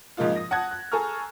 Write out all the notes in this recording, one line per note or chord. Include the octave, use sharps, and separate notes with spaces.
G#2 C#3 F3 A#3 D#4 F4
D#6 A#6
F#5 A5 D#6 F#6 G#6
F#6
G#4 A4 G#5 A#5 C#6 F6